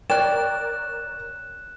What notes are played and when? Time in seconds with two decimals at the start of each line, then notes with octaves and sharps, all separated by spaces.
0.10 A#4 C#5 D5 G5 F#6 E7